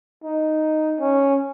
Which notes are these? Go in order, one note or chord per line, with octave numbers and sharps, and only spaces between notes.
D#4
C#4